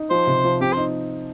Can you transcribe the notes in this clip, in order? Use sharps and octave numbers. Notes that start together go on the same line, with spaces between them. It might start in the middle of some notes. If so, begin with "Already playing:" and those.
Already playing: D#4
F3 C5
C3
F3
C4 G4
D#4 C5